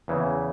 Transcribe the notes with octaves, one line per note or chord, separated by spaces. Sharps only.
E2 C#3 E3